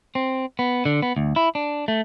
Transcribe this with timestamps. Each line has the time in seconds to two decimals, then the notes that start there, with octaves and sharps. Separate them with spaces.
0.15 C4
0.59 B3
0.85 D3
1.02 B3
1.17 D2
1.36 E4
1.55 D4
1.88 A3